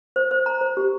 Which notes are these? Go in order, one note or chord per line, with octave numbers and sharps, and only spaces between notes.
C5
C5
A#5
C5
G4